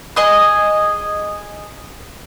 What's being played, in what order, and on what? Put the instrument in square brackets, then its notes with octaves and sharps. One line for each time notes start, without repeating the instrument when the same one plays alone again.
[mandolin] G#4 D#5 D#6